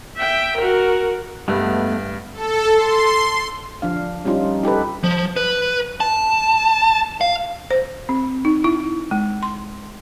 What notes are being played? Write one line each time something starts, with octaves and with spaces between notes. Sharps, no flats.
E5 G5
F#4 A#4
G2 G#3 A3 B3
A4
C6
F3 D4 F5
G3 C#4 D#4 F4
D#4 G4 A4 B4
F3
B4
A5
F5
C5
C4
D#4
E4
G#3
C6